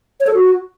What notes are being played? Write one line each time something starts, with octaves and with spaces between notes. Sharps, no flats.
C#5
A4
F#4